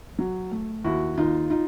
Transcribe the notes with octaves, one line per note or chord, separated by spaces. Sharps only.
F#3
A3
D#2 E4 F#4
D#2 D#4 F4
D#4 F4